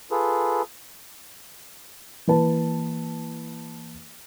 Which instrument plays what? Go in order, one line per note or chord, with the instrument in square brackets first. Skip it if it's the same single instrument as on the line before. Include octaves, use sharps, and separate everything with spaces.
[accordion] F4 G#4 A4 B4
[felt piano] E3 A#3 B4 A5